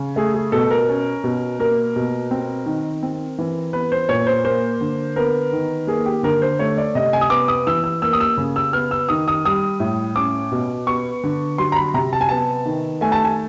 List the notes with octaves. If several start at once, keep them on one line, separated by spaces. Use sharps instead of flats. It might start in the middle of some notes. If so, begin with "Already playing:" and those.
Already playing: C#3
A3 G#4
G#4
B2 A4
A#4
C#4
B2
A#3 A#4
B2
C4
D#3
C4
E3
B3 B4
C5
A#2 C#5
C5
A#3 C5
D3
B3 A#4
D#3
A#3 G#4
G4
D3 A#4
C5
A3 C#5
D5
C3 D#5
G#5
D#6
B3 D6
D#6
E3 E6
E6
A#3 E6
D#6
E6
C#3
E6
B3 F6
E6
D#3 D#6
D#6
G3 D#6
A2
C#4 D6
B2
B3 C#6
D3
F#3 C6
A#5
B5
C3 A#5
A5
G#5
B3 A5
D#3
A3 G#5
A5
G#5